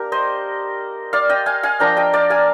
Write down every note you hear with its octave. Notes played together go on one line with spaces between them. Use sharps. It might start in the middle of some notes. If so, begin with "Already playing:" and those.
Already playing: A#3 D4 G4 A#4
C5 D#5
D5 F5
D#5 G5
F5 G#5
F5 G#5
F3 A#3 D4 G5 A#5
D#5 G5
D5 F5
F5 G#5